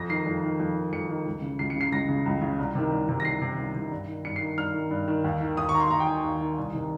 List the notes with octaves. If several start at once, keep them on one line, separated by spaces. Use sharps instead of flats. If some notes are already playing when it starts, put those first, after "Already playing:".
Already playing: F2 A#6
D#3 C7
F2
D#3
F2
D#3
F2 C#7
D#3
C#2
C#3
C#2 C7
C#7
C#3
C7
C#2 A#6
C#3
C#2
C#3
C2
C3 D#3
C2
C3 D#3
A#6
C2 C7
C3 D#3
C2
C3 D#3
G2
D#3
G2 C#7
C7
D#3
G2 F6
D#3
G2
D#3
D#2
D#3
D#2 D#6
C#6
D#3 A#5
C6
D#2 A#5
G5
D#3 G#5
D#2
D#3
C2
C3 D#3